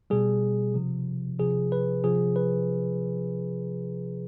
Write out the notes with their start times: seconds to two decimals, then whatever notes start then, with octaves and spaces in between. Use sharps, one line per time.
0.10 B2 G3 G#4
0.74 C3 F3
1.39 C3 F3 G#4
1.72 B4
2.04 C3 F3 G#4
2.36 B4